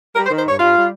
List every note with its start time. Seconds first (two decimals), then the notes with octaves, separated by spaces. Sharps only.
0.15 G3 A#4
0.26 C5
0.30 D#3
0.37 C5
0.45 G2 C#5
0.59 G2 F4
0.75 G3